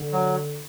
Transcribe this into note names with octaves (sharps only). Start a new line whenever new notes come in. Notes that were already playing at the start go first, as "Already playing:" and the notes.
Already playing: D3
F#3